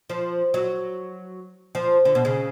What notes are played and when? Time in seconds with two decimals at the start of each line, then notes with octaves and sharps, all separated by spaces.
0.10 F3
0.54 F#3
1.75 F3
2.05 D3
2.15 B2
2.25 C#3